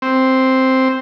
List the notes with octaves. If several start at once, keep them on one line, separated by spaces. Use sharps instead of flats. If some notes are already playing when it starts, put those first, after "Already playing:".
C4